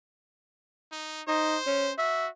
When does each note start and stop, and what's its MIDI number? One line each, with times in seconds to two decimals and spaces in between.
0.92 1.21 63
1.28 1.57 63
1.28 1.92 72
1.67 1.89 61
1.98 2.28 66
1.98 2.27 76